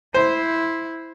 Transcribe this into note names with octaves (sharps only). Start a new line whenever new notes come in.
E4 C5